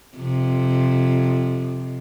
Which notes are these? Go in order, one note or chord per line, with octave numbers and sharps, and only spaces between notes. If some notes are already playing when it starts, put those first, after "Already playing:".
F2 C3